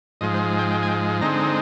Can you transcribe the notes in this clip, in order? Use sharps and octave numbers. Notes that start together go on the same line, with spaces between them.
G#2 F3 G#3 D#5
C5
G5
G5
G#5
G5
D3 G#3 C4 D#4 A#5